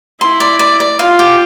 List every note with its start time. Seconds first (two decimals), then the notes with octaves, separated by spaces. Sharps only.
0.21 E4 C6
0.40 D5
0.59 D5
0.80 D5
0.99 F4 F5
1.19 G4